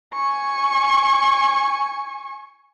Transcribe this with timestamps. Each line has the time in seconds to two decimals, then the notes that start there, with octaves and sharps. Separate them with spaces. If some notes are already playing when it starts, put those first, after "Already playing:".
0.13 G#5 C#6